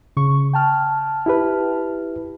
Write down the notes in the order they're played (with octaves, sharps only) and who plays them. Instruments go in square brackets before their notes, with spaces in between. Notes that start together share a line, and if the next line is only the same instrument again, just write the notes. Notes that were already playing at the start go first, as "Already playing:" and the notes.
[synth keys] C#3 C#6
G5 A5 F6
[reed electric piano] E4 G4 B4